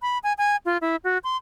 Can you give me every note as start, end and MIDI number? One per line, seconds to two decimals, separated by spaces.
0.02 0.18 83
0.23 0.33 80
0.38 0.56 80
0.65 0.78 65
0.81 0.96 64
1.04 1.18 66
1.24 1.37 84